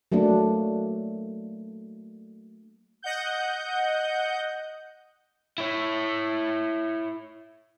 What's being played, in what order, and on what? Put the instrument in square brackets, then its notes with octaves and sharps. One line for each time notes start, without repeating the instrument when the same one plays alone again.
[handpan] F#3 A3 A#3 D4
[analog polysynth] D#5 F#5 G6
[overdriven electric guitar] E4 C#5